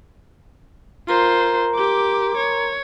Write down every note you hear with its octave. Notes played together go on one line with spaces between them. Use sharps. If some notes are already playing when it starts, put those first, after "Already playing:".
F4 A#4 C5 A#5 C6
G4 D6
C#5